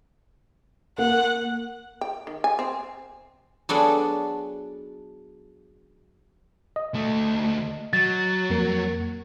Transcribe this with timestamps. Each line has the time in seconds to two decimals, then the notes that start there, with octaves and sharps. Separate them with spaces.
0.98 A#3 F#5
2.01 G5
2.27 D#3
2.44 G#5
2.59 C4
3.69 F#3 B3 D4 G#4 A4 D5
6.76 D#5
6.94 D2 A3
7.93 F#3 A6
8.50 F2 A#3 A#4